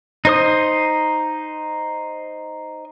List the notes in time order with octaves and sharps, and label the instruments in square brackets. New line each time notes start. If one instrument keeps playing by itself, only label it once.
[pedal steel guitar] D#4 C5 D#6